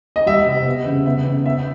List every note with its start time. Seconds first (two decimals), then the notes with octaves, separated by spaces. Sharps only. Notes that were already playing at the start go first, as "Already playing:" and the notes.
0.16 D#5
0.26 G3 E5
0.47 C3
0.66 B3
0.86 C#3
1.06 B3 E5
1.26 C#3
1.45 B3 E5